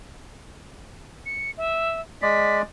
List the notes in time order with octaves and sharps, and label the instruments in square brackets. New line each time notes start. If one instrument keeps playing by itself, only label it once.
[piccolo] C#7
E5
[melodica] G#3 D5 [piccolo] B6